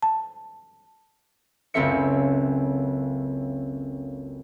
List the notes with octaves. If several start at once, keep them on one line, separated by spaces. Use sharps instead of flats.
A5
F#1 C#2 C4 A4 E5 C#7